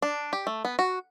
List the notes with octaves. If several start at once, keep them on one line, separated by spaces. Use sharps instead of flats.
D4
G4
A3
B3
F#4